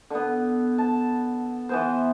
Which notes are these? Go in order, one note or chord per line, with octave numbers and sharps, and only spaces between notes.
D3 B3
A5
E3 B3 C5